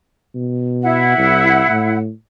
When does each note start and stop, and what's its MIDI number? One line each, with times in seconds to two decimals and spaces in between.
0.35 1.16 47
0.82 1.96 64
0.82 1.96 78
1.18 1.64 36
1.69 2.11 45